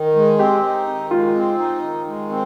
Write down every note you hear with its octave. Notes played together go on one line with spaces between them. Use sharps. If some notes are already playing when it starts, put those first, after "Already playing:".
Already playing: D#3 D#4
G#3
C4 G4
D#4
D#3
G#3 F4
C4
D#4
D#3
G#3
C4